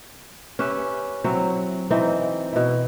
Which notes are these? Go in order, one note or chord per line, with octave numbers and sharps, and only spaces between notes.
C#4 G4 B4 E5
F#3 C4 E4
E3 C4 D#4
B2 E4